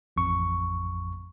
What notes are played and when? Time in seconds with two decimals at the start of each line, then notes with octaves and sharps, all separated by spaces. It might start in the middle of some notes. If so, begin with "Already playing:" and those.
0.16 A1 F2 C#6